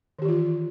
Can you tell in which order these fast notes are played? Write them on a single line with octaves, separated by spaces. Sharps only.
D#3 G4 E3 F4